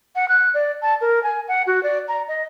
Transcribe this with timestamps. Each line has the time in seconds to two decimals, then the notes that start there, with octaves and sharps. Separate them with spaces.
0.16 F#5
0.29 F#6
0.54 D5
0.82 A5
1.01 A#4
1.23 G#5
1.48 F#5
1.67 F#4
1.83 D5
2.08 A#5
2.28 D#5